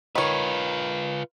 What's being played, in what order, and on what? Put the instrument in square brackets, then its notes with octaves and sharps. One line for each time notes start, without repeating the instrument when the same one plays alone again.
[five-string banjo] D#3 C#5 [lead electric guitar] F4 B4